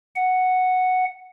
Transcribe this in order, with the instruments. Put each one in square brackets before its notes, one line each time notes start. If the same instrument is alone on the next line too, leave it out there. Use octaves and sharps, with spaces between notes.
[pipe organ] F#5